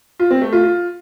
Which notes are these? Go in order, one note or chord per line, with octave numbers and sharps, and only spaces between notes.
F4
C4
A3
F4
F4